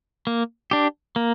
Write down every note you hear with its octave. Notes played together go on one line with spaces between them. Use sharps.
A#3
D4 G4
A#3